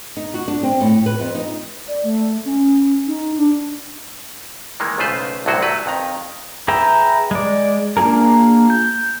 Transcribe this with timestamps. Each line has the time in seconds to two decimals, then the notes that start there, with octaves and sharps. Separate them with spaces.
0.17 D#4
0.34 F#4
0.48 D4
0.63 C4
0.81 A2
1.06 B4
1.20 F2
1.35 D#4
1.88 D5
2.04 A3
2.45 C#4
3.07 D#4
3.37 D4
4.80 D#3 E3 G#3 A#3
4.98 B1 C#3 A3 F4 B4 C5
5.46 C2 A2 D3 F#3 F#4 C5
5.63 F#3 A3 B4
5.86 F2 D#3 A#5
6.68 G#4 B4 E5 G5 A#5
7.31 G#3 D5
7.97 A#3 D4 F4 G#4 A#4
8.70 G6